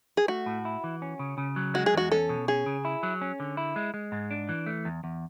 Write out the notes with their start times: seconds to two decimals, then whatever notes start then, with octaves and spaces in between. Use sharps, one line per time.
0.17 G#4
0.28 A3 F#4
0.46 A2
0.65 E4
0.84 E3
1.02 C#4
1.19 C#3
1.38 C#3
1.56 F#3
1.74 G#3 F#4
1.86 G#4
1.94 E2 F#4
2.12 C#4 A4
2.29 B2
2.48 C#4 G#4
2.66 C#3
2.85 E4
3.03 F#3
3.21 C#4
3.40 D3
3.57 E4
3.76 G#3
3.94 G#3
4.12 G#2
4.31 D4
4.49 E3
4.66 A3
4.85 E2
5.04 E2